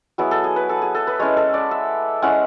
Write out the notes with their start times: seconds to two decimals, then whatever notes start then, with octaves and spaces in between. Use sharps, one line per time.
0.18 F#3 B3 E4 G#4
0.31 A4
0.44 G#4
0.56 B4
0.69 A4
0.82 G#4
0.95 A4
1.07 B4
1.19 G#3 C#4 E4 C#5
1.37 A4
1.54 D5
1.71 E5
2.22 G#3 C#4 E4 F#5